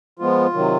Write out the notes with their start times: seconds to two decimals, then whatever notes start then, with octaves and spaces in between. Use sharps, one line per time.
0.19 F3 G#3 B3 F4
0.53 C3 D#3 F#3